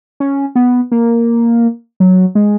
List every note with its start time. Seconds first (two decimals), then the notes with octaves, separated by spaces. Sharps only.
0.20 C#4
0.55 B3
0.92 A#3
2.00 F#3
2.35 G#3